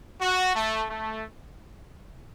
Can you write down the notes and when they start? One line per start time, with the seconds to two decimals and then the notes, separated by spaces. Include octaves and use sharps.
0.21 F#4
0.54 A3
0.87 A3